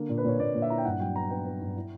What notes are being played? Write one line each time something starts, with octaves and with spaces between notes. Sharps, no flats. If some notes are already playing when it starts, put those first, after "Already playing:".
Already playing: D3 A#3
A#2
B4
A#2 C#5
A#2 D5
A#2
E5
E4 A#5
G5
G2 F#5
F#3 G5
B3 A#5
B3 G5
B3
G2
E4